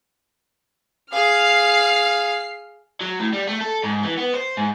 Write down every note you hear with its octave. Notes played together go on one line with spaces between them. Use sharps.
G#4 F5 F6 C7
F#3
A2
G3
A3
A4
G#2
E3
B3
C5
G#2